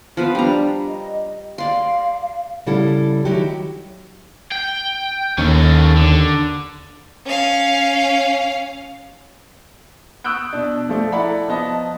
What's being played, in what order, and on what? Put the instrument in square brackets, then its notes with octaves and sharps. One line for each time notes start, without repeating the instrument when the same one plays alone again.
[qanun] F3 B4 F5 [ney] B3
[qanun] G3 A#5 [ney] D4
[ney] D#5
[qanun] D5 C6 [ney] F5
[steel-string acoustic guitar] C#3 G3 E4 A4 F#5
D#3 F#3 E4 F#4 G4
[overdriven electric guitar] G5
[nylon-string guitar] D#2 [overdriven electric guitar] C#4 A4
[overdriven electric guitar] D3
[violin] C#4 F5
[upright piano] C#6 D#6 E6 F#6 G6 D7
B2 D4
F3 A3 D5
E4 A4 D5 F#5 A#5 B5
F3 B3 D#5 A5